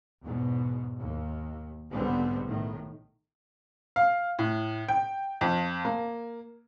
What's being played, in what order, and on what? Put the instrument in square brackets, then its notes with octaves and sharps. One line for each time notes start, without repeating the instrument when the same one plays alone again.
[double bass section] E2 G#2 B2
D#2
B1 G#2 D3 G3 B3 C4
A2 D#3
[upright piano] F5
A2
G5
F2
A#3